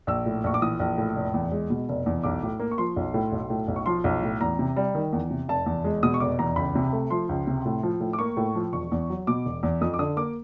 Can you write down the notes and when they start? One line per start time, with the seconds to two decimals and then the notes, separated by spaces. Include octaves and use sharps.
0.07 A#1 E6
0.26 A2
0.44 A#1 C#6
0.54 D6
0.62 E3 D#6
0.80 A#1
0.98 A2
1.16 F1
1.34 E2
1.52 G#3
1.70 B2
1.89 F1
2.06 E2
2.23 B1 D6
2.43 A2
2.60 A#3
2.71 C#6
2.78 F3 C6
2.96 B1
3.14 A2
3.32 B1
3.50 A2
3.68 B1
3.76 C#6
3.86 F3 C6
4.04 B1
4.22 A2
4.41 E2 A#5
4.59 C3
4.76 G3
4.95 D#3
5.13 E2
5.30 C3
5.48 F1 A5
5.66 E2
5.84 G#3
6.03 B2 D#6
6.14 C#6
6.20 F1 D6
6.39 E2 A#5
6.56 C#2 B5
6.75 C3
6.93 A3
7.10 F3 C6
7.29 C#2
7.47 C3
7.65 A2
7.83 F3
8.00 A2
8.13 D6
8.19 A#3 C#6
8.37 A2
8.55 F3
8.73 E1 C#6
8.92 E2
9.10 F#3
9.27 B2 D6
9.45 E1
9.63 E2
9.81 F2 D#6
9.94 D6
9.99 D3 D#6
10.17 A#3 D6